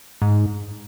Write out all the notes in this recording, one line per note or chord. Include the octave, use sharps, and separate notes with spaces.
G#2